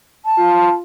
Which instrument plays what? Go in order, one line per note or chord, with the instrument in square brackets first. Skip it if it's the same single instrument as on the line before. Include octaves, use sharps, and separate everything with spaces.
[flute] A5
[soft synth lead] F4